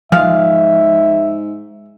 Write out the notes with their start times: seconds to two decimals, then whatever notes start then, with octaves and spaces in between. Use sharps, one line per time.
0.12 G#2 F3 G#4 E5 F5